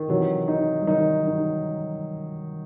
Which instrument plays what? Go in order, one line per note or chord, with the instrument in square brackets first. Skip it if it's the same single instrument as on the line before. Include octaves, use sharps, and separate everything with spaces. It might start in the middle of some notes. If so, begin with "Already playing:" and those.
Already playing: [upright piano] D#3
[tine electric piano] C3 E3 [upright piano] F#3
[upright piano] D#4
[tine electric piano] G3
[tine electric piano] D#3 F#3 [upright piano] D#4
[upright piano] D#4